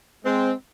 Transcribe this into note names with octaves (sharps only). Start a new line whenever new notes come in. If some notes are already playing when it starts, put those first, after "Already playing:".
G#3 C4